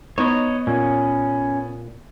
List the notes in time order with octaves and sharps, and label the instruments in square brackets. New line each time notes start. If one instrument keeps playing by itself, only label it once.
[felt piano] B3 [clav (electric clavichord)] D#4 [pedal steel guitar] C#5 D#5
[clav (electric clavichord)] A#2 [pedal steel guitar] C#4